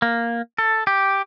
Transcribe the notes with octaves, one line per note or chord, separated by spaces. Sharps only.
A#3
A4
G4